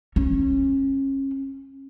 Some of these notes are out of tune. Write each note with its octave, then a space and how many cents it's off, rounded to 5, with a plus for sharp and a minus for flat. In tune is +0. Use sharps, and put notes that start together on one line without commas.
C#4 -30